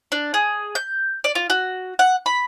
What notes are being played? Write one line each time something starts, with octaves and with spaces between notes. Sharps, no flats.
D4
G#4
G6
D5
F4
F#4
F#5
B5